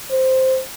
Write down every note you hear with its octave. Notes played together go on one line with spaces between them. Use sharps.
C5